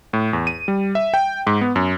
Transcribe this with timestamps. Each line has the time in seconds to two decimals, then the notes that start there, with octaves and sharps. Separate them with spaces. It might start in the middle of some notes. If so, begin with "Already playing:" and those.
0.13 A2
0.33 E2
0.47 D#7
0.68 G3
0.95 E5
1.14 G5
1.47 G#2
1.61 B3
1.76 F#2